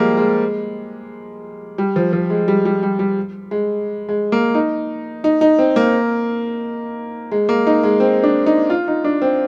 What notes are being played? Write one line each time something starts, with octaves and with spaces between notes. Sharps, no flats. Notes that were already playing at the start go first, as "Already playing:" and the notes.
Already playing: F3 G3 G#3 A#3
G#3
G3
F3
F3
G#3
G3
G3
G3
G3
G#3
G#3
A#3
D#4
D#4
D#4
C4
A#3
G#3
A#3
D#4
G#3
C4
D4
D#4
F4
D#4
D4
C4